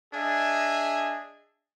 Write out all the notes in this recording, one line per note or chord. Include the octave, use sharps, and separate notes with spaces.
D4 G#4 D#5 E5 G#5